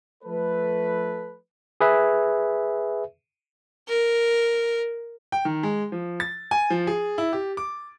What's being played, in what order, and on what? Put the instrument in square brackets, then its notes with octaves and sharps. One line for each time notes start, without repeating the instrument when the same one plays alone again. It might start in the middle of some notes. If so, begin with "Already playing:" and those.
[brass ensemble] F3 A3 A4 B4
[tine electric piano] G#4 B4 E5
[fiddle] A#4
[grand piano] G5
D#3
G#3
F3
A6
G#5
F3
G#4
E4
G4
D6